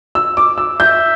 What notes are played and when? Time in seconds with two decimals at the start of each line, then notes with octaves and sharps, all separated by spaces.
0.15 E6
0.37 D6
0.58 E6
0.80 E5 G6